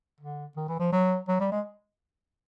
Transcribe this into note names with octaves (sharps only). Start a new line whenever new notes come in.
D3
D#3
E3
F3
F#3
F#3
G3
G#3